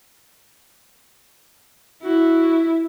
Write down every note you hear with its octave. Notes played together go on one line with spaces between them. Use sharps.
E4 F#4